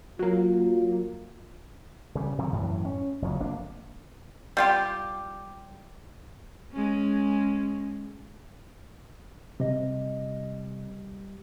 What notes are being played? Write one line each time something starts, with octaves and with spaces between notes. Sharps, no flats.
F#3 A#3 F4
C#3 G3
C3 D#3 F#3
F#2 A2 E3
C#4
F#1 D2 F3 F#3
F1 A#3 D4
G3 F4 G4
G#3 C#4
C3 G3 D#5